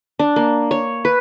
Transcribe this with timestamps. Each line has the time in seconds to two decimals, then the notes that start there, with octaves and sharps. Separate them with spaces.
0.19 D4
0.36 A#3
0.71 C#5
1.05 B4